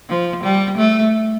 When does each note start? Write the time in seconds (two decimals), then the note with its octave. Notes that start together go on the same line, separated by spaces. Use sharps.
0.09 F3
0.44 G3
0.78 A3